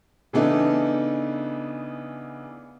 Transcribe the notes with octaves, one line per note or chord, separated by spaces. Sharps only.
C#3 E3 A3 B3 D4 D#4